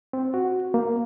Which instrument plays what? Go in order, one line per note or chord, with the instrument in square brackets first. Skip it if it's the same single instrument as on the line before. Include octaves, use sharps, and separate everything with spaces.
[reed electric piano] C4
F#4
A#3